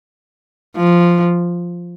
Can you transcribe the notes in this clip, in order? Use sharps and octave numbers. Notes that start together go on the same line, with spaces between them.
F3